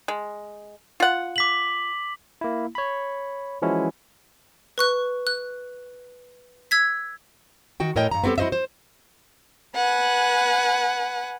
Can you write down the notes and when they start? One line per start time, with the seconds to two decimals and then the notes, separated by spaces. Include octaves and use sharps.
0.08 G#3
1.00 F4 F#5
1.36 D6 B6 F#7
2.41 A#3 E4
2.75 C#5 B5
3.62 E3 F3 G#3 C#4 E4 F#4
4.78 B4 C#6 F#6
5.27 F#6
6.71 E6 G#6 B6
7.80 D#3 F#4 G5
7.96 A2 A#4 C#5 D#5 G5
8.11 G2 A#5
8.24 B3 C4 F4 G4 A4
8.38 E4 F#4 C5 D#5 E5
8.52 C5
9.75 B4 F#5 G#5